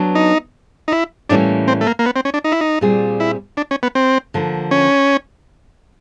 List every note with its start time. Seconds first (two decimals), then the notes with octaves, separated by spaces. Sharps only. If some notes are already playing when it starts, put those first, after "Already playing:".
Already playing: F#3 B3 D4
0.15 D#4
0.88 D#4
0.92 E4
1.29 A2 E3 G3 A#3 C#4 D4
1.68 C4
1.81 A3
1.87 A#3
1.99 A#3
2.06 B3
2.16 C4
2.25 C#4
2.34 D4
2.44 D#4
2.52 E4
2.61 D#4
2.81 A#2 G3 C4 F4 G#4
3.20 E4
3.57 D4
3.71 C#4
3.83 B3
3.95 C4
4.34 D3 F3 A#3
4.71 C#4